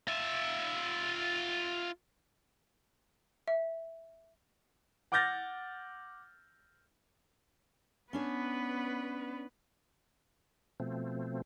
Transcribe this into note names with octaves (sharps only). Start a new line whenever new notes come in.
F4 E5
E5
F#5 D6 F6 G6 A6 A#6
B3 C#4 D4 B4 C#5
B2 F3 A3 C4